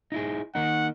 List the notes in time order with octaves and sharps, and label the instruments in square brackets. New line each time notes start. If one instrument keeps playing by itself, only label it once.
[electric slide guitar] D#4 E4 G#4
[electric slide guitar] D#3 A#3 D#4 [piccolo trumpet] F#5